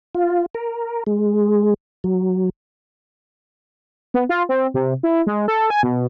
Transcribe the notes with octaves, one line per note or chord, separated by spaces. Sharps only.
F4
A#4
G#3
F#3
B3
F4
C4
C3
E4
G#3
A4
G#5
B2